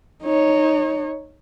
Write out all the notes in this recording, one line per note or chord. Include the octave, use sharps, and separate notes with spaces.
D#4 C#5